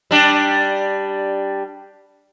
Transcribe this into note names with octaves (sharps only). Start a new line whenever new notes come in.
G3 D4